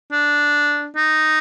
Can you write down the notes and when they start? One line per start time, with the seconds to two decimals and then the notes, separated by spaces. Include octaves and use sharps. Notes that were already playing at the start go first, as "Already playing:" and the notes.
0.12 D4
0.96 D#4